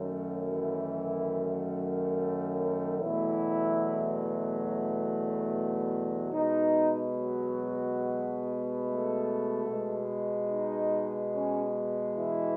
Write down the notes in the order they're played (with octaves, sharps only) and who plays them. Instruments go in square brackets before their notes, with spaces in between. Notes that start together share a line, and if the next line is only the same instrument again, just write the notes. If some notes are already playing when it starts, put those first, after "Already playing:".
Already playing: [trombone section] F#2 D#3 F#3 A3
E3 E4
E2 B2 E3 F#3 A3 E4
B2 G#3 B3 D#4
F#3 F#4
A3 A4
B2 G#3 B3
D#4
C#4
E3 E4